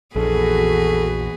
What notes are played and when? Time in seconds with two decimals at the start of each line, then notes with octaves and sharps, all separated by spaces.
0.16 A#1 E2 F#4 G#4 A4 B4